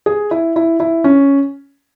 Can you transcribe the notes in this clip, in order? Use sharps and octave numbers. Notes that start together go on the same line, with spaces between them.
G#4
E4
E4
E4
C#4